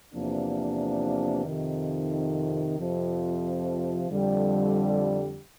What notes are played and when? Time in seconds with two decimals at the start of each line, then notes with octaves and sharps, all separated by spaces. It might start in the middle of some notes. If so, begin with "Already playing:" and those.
0.13 E2 C3 F3 A#3 D4
1.44 F2 C3 D#3
2.76 F2 C3 F3
4.08 F2 D3 G3